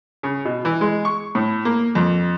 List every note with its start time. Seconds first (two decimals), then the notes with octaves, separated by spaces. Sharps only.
0.23 C#3
0.45 B2
0.65 E3
0.81 G#3
1.05 C#6
1.35 A2
1.65 A#3
1.95 F2